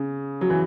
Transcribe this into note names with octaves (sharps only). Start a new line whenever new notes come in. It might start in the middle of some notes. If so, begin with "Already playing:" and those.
Already playing: C#3
F#3
E3